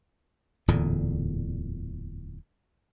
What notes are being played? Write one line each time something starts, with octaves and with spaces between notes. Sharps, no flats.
D1 E2 A#2 D3